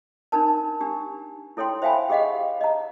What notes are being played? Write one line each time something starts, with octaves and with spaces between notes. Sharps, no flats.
D4 D#4 A#4 A5
D4 G4
E4 A4 C#5 G5 C6
C5 E5 F5 G5 G#5 B5
G4 G#4 D#5 F5 F#5
D#5 A#5